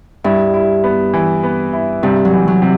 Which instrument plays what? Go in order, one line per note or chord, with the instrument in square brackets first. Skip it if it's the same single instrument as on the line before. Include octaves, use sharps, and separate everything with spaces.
[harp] G2 [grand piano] E4
[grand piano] E4
B3
E3
B3
E4
[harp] G2 [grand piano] C3
[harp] F#3
[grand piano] E3
[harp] F#3
[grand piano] C3